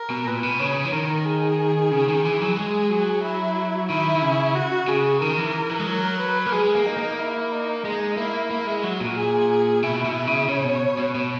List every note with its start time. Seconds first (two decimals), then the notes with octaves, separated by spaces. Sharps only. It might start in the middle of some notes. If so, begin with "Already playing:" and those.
Already playing: A#4
0.10 B2
0.27 A#2 B4
0.43 B2
0.59 C#3 C#5
0.85 E3
0.92 D#3 A#4
1.25 G#4
1.91 C#3
2.09 D#3
2.25 E3
2.42 F#3
2.57 G#3 G#4
2.90 F#3
3.23 E4
3.89 D#3 E4
4.15 D#3
4.22 C#3
4.55 F#4
4.88 C#3 G#4
5.21 D#3 A#4
5.38 E3
5.71 E3
5.79 G#3
5.87 F#3 A#4
6.20 B4
6.46 A#3
6.52 G#3 G#4
6.75 A#3
6.86 D#4
6.97 A#3
7.19 E4
7.51 D#4
7.85 G#3 D#4
8.17 A#3 E4
8.50 A#3 E4
8.67 G#3
8.83 F#3 F#4
9.00 A#2
9.17 G#4
9.83 B2 E4
10.05 B2
10.27 C#3
10.48 C#3 C#5
10.65 B2
10.99 B2
11.15 B2